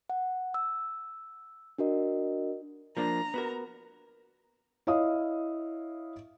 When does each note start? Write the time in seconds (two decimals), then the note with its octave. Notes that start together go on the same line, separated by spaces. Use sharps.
0.10 F#5
0.54 E6
1.78 D4 F#4 A#4 D#5
2.97 F3 A#3 D4 A#5
3.34 B3 F#4 A#4
4.87 E4 C#5 D#5 F5 D#6